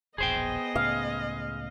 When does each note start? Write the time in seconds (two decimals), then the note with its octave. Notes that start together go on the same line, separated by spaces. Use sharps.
0.18 E1 A#1 B3 G#4 C5 D#5 G5
0.75 C#2 A2 C#3 F5